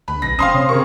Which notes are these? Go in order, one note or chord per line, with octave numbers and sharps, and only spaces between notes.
D2 B4 B5
B1 A#6
F1 C4 C#4 F5 C6 D#6
C3 C#5
C#3 A#4 C#6